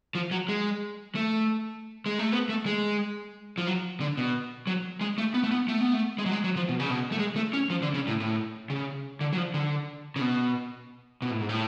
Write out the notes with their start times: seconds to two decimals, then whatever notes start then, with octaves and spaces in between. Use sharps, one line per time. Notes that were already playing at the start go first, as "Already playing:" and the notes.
0.15 F3
0.31 F#3
0.48 G#3
1.15 A3
2.06 G#3
2.19 A3
2.32 B3
2.49 A3
2.66 G#3
3.58 F3
3.67 F#3
4.00 D3
4.17 B2
4.67 F#3
5.01 G#3
5.18 A3
5.34 B3
5.43 A3
5.51 B3
5.68 A3
5.81 B3
5.93 A3
6.18 G#3
6.26 F#3
6.31 G#3
6.44 F#3
6.56 F3
6.69 B2
6.80 C#3
6.90 B2
7.12 A3
7.19 G#3
7.36 A3
7.53 C#4
7.70 F3
7.82 D3
7.94 C#3
8.07 A2
8.20 A2
8.70 C#3
9.21 D3
9.33 F#3
9.37 F3
9.54 D3
10.16 C#3
10.21 B2
11.22 B2
11.31 A2
11.41 G#2
11.49 A2